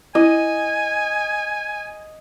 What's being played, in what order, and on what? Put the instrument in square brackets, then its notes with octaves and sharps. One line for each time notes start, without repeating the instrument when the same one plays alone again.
[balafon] E4 [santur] D#5 [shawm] G#5